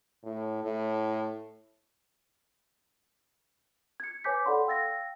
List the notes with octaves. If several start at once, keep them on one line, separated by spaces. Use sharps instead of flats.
A2
A2
G#6 C#7
B4 C#5 G#5 D6 G6 B6
A4 D5 F#5 B5 C6
F5 G5 E6 A6 A#6